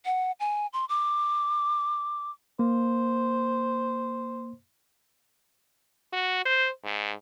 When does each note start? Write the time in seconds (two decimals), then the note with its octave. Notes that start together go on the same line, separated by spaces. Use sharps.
0.05 F#5
0.40 G#5
0.73 C6
0.89 D6
2.59 A#3 C5
6.13 F#4
6.45 C5
6.84 G#2